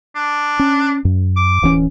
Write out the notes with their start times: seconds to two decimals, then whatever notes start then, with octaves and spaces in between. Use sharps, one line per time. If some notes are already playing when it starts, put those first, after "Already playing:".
0.16 D4
0.59 C#4
1.05 F#2
1.36 D6
1.62 D1 E3 C#4